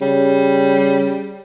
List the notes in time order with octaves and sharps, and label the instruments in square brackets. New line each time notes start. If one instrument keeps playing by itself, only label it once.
[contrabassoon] C#3 [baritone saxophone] G3